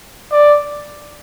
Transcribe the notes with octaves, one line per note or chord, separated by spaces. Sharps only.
D5